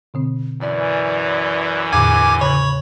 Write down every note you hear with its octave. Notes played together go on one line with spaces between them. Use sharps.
B2 D3 C4
F#2 E3 D5
E2 A2 D3 G#5 D6
C#3 C#5 B5